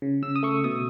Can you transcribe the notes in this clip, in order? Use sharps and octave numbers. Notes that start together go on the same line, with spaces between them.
C#3
C#3 E6
D#6
A3 C#6
B2 D#6